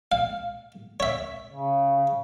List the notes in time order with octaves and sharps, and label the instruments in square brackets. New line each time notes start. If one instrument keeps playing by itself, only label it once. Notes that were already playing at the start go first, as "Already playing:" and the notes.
[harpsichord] F5
C#5 E5
[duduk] C#3